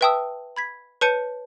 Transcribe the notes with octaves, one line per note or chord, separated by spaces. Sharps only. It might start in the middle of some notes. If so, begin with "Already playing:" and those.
B4 E5 G5 A5 D#6 E6
B5 G#6 B6
B4 C#5 A5 G6 C#7 D#7